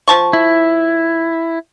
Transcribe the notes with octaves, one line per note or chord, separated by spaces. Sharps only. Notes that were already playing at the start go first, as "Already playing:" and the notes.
F3 A5 C#6
E4